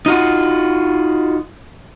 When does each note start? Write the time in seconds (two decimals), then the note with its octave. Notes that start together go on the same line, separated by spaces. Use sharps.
0.06 D#4 F4 F#4